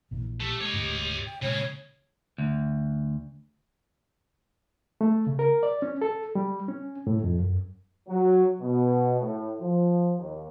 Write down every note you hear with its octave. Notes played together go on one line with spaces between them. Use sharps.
A#1 A#2 E3
A3 G4
G#3 C#5 D#5
D1 D2 G#2
G5
A#2 C#3 G#3 C#4 C#5
D2
A3
C#3
A#4
D5
C#4
A4
G3
C#4
A2
F2
F#2
F#3
B2
A2
F3
D#2